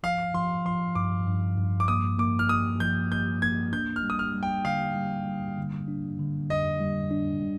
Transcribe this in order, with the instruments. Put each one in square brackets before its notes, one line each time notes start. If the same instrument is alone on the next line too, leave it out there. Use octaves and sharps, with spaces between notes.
[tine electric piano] F3 [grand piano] F5
[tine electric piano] F3 [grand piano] C6
[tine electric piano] F3 [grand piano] C6
[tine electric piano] G2 [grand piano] D6
[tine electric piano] G2
G2
[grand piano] D6
[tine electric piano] A#3 [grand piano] D#6
[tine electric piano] A#3 [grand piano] D6
[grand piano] F6
[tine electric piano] A#3 [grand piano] D#6
[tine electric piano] F3 [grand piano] G6
[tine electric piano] A#3 [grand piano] G6
[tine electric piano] A#3 [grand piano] G#6
[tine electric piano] D4 [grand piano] G6
[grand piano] F6
[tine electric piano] G3
[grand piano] D#6
F6
[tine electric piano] G3
[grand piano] G5
[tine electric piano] D3 [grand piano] F5
[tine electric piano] G3
G3
D3
D4
D3
[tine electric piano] F2 [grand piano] D#5
[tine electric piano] G3
D4
G3